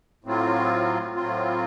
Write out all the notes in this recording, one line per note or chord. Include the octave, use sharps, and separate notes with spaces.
A2 F#3 C4 F4
A2 F#3 C4 F4